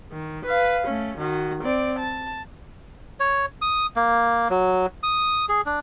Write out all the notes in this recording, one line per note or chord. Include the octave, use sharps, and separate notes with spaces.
D#3
B4 F5
A3 C#4
D#3 F#4
C4 D5
A5
C#5
D#6
A#3
F#3
D#6
G#4
D4